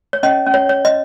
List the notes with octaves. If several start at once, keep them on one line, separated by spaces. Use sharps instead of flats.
C#5
C#4 D#5
C#4
C#5
C#5
D#5